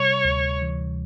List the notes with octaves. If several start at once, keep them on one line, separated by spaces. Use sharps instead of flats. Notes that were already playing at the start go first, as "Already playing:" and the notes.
Already playing: C3 G3 C#5
D2
E3